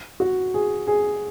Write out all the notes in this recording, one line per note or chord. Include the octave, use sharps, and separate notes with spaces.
F#4
G#4
G#4